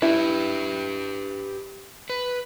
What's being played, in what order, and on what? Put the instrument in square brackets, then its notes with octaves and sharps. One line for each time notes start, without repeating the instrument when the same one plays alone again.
[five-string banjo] E4 [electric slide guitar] G4 B4
[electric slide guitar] B4